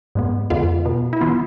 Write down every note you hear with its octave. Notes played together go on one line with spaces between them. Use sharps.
G#2 G#3 B3
F2 D3 G#3 B3 F4
B2 B3
E4
E3 B3 F4